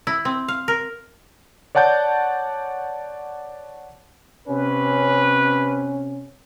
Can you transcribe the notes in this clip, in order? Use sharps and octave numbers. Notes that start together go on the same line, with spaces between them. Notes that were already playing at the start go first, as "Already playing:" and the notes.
E4
C4
F5
A#4
C#5 D5 F#5 A5 G6
C3 C#4 B4